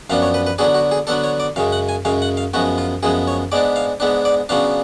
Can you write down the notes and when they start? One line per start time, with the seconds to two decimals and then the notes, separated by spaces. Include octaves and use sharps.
0.10 F#2 F3 B3 D4 F5
0.22 C#5
0.34 B4
0.46 B4
0.58 D3 F#3 B3 D4 G#4
0.75 F#4
0.91 G#4
1.07 D3 F#3 B3 D4 A4
1.24 C#5
1.40 D5
1.56 F#2 C#3 G#3 F5
1.72 F#5
1.89 G#5
2.05 F#2 C#3 G#3 F5
2.22 F#5
2.37 F5
2.54 F#2 F3 G#3 B3 F#4
2.78 F4
3.03 F#2 F3 G#3 B3 G#4
3.28 C#5
3.52 G#2 G#3 B3 D4 D5
3.76 F5
4.00 G#2 G#3 B3 D4
4.25 D5
4.49 C#3 F#3 B3 D4 F5